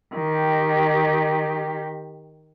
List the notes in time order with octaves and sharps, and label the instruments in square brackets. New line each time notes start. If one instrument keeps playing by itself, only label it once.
[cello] D#3 G4